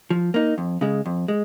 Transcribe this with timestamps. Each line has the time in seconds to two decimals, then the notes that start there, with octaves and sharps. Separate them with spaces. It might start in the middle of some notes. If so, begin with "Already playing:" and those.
0.10 F3
0.34 A#3 D#4
0.58 F2
0.81 C#3 G#3
1.06 F2
1.28 G#3